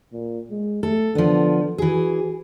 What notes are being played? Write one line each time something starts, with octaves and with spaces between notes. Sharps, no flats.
A#2
G#3
A3 A4
D3 F3 B3
E3 F#4 G#4